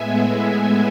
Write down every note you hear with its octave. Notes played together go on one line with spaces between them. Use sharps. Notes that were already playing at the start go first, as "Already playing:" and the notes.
Already playing: A2 G#3 B3 E5 G#5